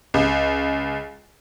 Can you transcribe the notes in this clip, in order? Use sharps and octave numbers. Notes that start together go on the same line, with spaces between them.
C#2